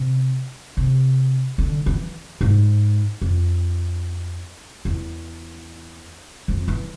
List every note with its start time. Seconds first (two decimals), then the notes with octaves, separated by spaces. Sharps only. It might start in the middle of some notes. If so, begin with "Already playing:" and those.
Already playing: C3
0.77 C3
1.58 D3
1.86 E3
2.41 G#2
3.22 F2
4.85 E2
6.48 F2
6.68 E3